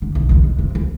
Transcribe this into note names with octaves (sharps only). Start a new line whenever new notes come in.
D3
B1
D#2 C#3
B2
C3
D2